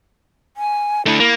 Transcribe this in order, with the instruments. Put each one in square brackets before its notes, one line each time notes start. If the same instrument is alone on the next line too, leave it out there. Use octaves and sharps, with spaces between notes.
[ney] G#5
[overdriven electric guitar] A3 D4 [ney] E4
[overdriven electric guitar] A#3